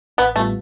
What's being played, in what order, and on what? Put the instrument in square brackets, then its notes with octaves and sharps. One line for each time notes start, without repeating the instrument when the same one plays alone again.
[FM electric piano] A1 [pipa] B3
[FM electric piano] A2 G3 B3 F4 [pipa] A3